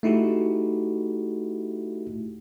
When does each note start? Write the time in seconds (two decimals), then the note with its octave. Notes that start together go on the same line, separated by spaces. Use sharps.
0.03 A3 D#4 E4 F#4 G4